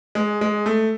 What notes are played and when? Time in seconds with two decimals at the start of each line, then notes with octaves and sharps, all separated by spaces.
0.15 G#3
0.41 G#3
0.66 A3